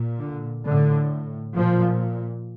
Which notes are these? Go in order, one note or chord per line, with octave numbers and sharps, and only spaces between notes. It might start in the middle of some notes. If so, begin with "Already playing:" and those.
Already playing: A#2
D3
A2 D3
A#2 F3